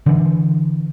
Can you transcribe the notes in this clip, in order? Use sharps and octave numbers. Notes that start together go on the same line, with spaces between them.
D3 E3